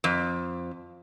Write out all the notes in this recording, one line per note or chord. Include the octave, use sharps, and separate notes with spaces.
F2